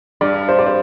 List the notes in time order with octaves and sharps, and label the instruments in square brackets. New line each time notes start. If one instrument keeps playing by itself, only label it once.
[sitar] G2 [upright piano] D5
[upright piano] C5
D5
C5